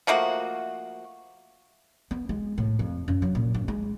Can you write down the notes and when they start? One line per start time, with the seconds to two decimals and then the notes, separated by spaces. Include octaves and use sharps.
0.07 F3 A3 A#3 F#4
2.11 B3
2.29 G#3
2.58 A2
2.79 F2
3.08 F#2
3.22 F#3
3.35 A#2
3.54 G2
3.68 G#3